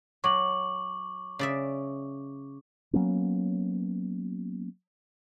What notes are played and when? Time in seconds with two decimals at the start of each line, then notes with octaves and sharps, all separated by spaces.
0.24 F#3 C#6 D6 F#7
1.39 C#3 D5 E5
2.93 F#3 A#3 B3 C#4